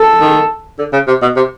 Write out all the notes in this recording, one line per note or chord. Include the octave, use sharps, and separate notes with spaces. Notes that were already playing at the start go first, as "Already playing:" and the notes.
Already playing: A4
D#3
D3
C#3
C3
B2
C3